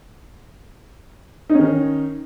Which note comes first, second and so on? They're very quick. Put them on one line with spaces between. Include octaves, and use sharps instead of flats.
D#4 C#4 D#3